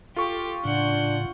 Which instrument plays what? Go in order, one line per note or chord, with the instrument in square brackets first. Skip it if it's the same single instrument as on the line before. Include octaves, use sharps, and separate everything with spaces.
[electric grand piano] F4 C#6 [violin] G4 [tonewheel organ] A4
[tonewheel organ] A2 C#3 [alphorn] D4 [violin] F#5 G6